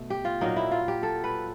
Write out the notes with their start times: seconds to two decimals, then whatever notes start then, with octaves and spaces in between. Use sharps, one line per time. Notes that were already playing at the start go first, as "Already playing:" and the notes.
Already playing: B2 A3
0.10 G4
0.25 F4
0.41 A#2 F#3 A#3 D#4
0.56 E4
0.72 F4
0.88 G4
1.03 A4
1.24 B4